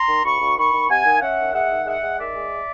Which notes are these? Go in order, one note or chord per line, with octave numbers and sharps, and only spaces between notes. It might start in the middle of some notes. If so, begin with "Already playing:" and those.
Already playing: A#5 C6
D#3
D2 B5 C#6
D2
D#3 B5 C#6
D#3
C3 F#5 G#5
D#3
F5
C#4 E5 F#5
D#3
G#3 E5 F#5
D#3
G#3 E5 F#5
G#3
D#3 D5 E5
G#3